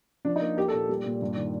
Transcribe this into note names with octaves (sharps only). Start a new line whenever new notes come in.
F3 D4
D#4
A#3
A#3 G4
A4
A#2
G3
A#2
G2
D#3